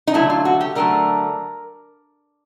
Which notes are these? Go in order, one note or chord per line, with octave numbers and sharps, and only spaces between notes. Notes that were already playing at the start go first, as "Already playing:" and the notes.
D#4
D3 F#3 A3 E4
F4
F#4
G4
D3 F#3 A3 A#4